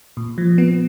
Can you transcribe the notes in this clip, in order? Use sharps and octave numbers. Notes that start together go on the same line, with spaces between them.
A#2
F3
B3